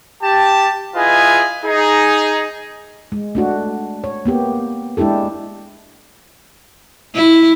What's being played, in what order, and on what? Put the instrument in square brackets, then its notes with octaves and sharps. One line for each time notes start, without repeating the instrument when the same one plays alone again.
[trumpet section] G4 A5
E4 F4 G#4 B4 D#5 G#5
D#4 G#4
[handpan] G#3
A3 D4 F#4
C#5
A#3 B3 G4
G#3 D4 E4 G4 A4
[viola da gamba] E4